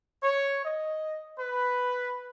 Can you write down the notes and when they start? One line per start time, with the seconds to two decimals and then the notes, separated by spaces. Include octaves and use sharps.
0.23 C#5
0.65 D#5
1.39 B4